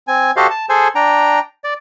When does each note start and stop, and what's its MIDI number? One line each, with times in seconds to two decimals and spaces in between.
0.08 0.31 60
0.08 0.31 80
0.37 0.47 66
0.37 0.47 67
0.37 0.47 69
0.37 0.47 72
0.37 0.47 75
0.37 0.47 77
0.50 0.66 81
0.69 0.88 68
0.69 0.88 69
0.69 0.88 72
0.69 0.88 80
0.95 1.39 62
0.95 1.39 79
0.95 1.39 82
1.64 1.74 74